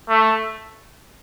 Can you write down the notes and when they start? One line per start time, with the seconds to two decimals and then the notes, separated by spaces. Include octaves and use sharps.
0.09 A3